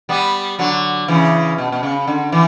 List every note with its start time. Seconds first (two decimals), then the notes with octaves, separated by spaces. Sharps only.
0.09 G3 B3
0.59 D3 F#3
1.08 C#3 E3
1.58 B2
1.72 B2
1.83 C#3
2.08 D3
2.32 E3